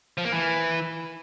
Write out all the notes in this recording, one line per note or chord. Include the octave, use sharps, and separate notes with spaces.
F3
A#3
E3